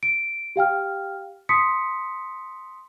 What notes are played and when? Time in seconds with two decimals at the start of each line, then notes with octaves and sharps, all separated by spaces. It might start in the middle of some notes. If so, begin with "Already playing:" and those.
0.03 D7
0.56 G4 F5 G5 F6
1.49 A5 C6 D#6 B6 C#7